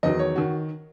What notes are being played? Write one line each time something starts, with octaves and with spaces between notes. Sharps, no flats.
E2 D#3 F#3 D#5
C#5
D#3 F#4